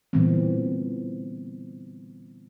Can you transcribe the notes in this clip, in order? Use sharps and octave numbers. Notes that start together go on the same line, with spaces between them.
A#2 D3 E3 G3 B3 C4